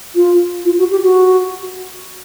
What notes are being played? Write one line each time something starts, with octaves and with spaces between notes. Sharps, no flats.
F4
F4
F#4
G4
F#4